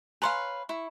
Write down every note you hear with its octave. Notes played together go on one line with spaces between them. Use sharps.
B4 C#5 F5 G#5 A#5 C6
E4 C#6